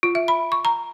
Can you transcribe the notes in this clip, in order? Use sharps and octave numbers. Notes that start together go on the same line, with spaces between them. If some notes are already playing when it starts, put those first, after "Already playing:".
F4
E5
B5
C#6
A#5